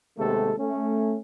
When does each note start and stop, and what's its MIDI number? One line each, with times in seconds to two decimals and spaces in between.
0.18 0.53 39
0.18 0.53 48
0.18 0.53 56
0.18 0.53 57
0.18 0.53 59
0.18 0.53 69
0.59 1.18 57
0.59 1.18 61